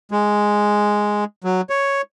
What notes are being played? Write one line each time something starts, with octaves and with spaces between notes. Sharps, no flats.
G#3
F#3
C#5